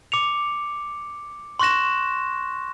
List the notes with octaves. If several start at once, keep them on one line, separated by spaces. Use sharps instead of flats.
D6 C#7 F7
C6 C#6 F#6 A#6 E7